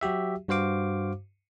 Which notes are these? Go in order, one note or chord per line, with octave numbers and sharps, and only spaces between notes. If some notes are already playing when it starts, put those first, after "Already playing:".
F#3 F#4 G4 E5
G2 F#4 C5 F5 D6